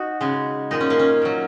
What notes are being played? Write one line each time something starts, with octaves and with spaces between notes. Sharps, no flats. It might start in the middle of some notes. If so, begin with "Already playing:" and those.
Already playing: D#4 F#4
C#3 G#3
A#2 G#3 D#4
C#4
A#3
C#4
A#2 F#3